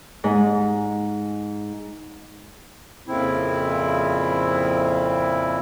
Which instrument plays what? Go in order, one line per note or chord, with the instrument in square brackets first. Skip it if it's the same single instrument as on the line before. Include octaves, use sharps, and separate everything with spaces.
[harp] G#2
[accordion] F2 A#2 C#3 C4 E4